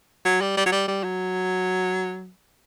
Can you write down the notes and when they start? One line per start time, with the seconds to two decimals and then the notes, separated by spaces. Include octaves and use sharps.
0.25 F#3
0.41 G3
0.57 G3
0.66 F#3
0.72 G3
0.88 G3
1.03 F#3